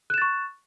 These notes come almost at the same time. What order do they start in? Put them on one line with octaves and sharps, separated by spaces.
F#6 E7 A6 C#6